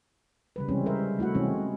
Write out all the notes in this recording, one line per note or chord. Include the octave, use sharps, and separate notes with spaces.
C#3 G3 B4
C3 E3 G3 G#3 C4 C#4
G3 A#4 C5 E5
A3 E4 F#4 F#5
C3 E3 G#3 C4 C#4